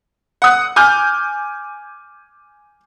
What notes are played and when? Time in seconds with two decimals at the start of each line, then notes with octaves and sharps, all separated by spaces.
0.42 F#5 D#6 F#6
0.76 G#5 D6 F6 G6